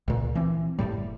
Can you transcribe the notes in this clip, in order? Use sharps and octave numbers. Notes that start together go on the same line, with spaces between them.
C#2 A#2
E3 C4
F#1 C#2 A2 G3